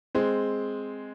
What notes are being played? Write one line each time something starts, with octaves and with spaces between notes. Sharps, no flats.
G#3 C4